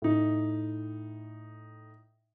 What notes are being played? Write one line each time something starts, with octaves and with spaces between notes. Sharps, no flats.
A2 D#4